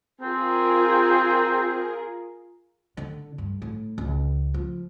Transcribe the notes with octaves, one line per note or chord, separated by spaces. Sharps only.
C4 F4 G#4 A#4
D3
G2
A2
C#2
F3